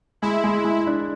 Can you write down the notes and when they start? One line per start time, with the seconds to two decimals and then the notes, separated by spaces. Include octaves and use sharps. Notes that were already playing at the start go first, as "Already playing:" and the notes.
0.22 G#3 E4
0.44 G#3
0.65 G#3
0.87 D4